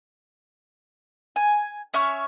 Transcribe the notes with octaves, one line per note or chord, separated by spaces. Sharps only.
G#5
C#4 E5 C#6 F6